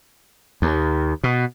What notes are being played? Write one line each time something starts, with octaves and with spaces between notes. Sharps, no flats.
D#2
B2